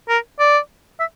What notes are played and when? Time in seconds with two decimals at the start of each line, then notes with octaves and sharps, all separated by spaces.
0.09 A#4
0.40 D5
1.00 E5